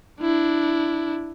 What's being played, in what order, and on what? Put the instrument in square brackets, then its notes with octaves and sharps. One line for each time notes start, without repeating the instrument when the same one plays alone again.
[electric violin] D4 E4